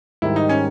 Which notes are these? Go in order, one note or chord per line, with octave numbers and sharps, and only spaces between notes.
G#2 D#3 G3 E4
D#4
C#4